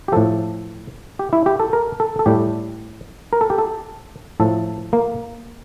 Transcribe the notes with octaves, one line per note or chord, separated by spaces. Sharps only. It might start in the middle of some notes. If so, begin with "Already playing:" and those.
G4
A2 F3 A4
G4
E4
G4
A4
A#4
A4
A4
A2 G3 G4
A#4
A4
G4
A4
A2 F3 A4
A#3